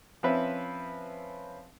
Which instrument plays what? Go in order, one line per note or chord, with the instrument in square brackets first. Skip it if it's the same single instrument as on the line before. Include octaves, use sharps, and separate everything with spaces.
[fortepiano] F3 C4 C#4 B4 E5